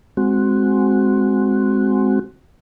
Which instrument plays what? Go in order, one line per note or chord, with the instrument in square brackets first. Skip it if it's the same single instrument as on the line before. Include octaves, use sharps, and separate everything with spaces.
[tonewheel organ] G#3 C4 F#4